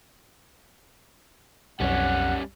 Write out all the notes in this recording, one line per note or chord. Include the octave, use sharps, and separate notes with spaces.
B1 F2 G3 C#4 F#5